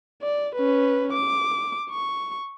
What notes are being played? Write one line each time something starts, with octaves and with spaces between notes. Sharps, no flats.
D5
C#4 B4
D6
C#6